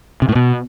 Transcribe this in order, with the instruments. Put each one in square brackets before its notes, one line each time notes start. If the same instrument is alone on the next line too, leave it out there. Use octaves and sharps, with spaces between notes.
[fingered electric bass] C3
A2
B2